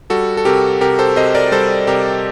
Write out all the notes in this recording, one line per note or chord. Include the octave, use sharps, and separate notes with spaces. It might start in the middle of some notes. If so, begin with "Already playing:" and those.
G3 F#4 A4
A4
C3 G4 A#4
C3 G4 A#4
A4 C5
C3 C5 D#5
A#4 D5
G3 A4 C5
C3 G4 A#4